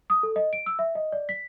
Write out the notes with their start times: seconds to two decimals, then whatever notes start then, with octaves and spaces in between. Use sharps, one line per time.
0.10 D#6
0.23 A4
0.36 D#5
0.53 D7
0.66 E6
0.79 E5
0.95 D#5
1.12 D5
1.29 B6